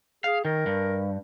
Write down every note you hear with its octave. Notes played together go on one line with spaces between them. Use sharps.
G#4 F5
D#3 A#4
G2